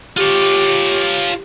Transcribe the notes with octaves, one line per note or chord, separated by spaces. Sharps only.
F4 G4 C#5